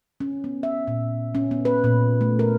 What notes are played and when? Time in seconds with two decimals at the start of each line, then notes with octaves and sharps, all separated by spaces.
0.20 C#4
0.44 B3
0.63 E5
0.88 A#2
1.35 C#4
1.51 B3
1.65 B4
1.84 A#2
2.21 A3
2.39 A#4